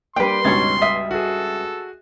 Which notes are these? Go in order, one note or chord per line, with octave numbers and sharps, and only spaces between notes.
G3 A#3 D4 B4 G5 C6
C#2 G2 B2 D#4 C#5 G#6 A6
E5 D#6
F#4 G#4 A4